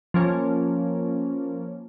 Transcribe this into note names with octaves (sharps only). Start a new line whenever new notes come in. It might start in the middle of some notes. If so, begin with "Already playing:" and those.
F3 A#3 C#4